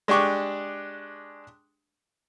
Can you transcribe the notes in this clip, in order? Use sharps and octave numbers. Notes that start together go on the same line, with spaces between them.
G#3 D4 G4 C#6 D6